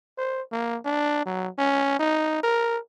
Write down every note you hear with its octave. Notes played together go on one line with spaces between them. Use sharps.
C5
A#3
D4
F#3
C#4
D#4
A#4